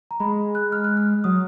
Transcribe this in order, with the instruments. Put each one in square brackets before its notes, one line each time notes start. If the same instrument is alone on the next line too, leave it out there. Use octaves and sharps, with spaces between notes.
[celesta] A#5
[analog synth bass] G#3 [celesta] B5
[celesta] F#6
F6
F#6
F6
[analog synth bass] F#3 [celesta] D#6